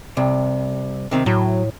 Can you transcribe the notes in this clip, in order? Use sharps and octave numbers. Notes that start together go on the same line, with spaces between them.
C2 C3
C3 D#3 C4
A2 F#3